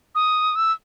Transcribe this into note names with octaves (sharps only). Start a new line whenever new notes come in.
D#6
E6